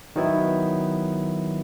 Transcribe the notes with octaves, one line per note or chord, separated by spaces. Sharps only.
D#3 F#3 B3 E4